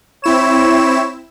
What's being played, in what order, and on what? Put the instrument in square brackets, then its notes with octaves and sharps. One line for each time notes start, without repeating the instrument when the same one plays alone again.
[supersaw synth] C4 E4 E7 [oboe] C#5